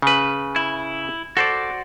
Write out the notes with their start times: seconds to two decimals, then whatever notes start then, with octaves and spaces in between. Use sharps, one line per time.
0.02 C#3 B4
0.56 E4
1.37 F#4 A4 C5 D5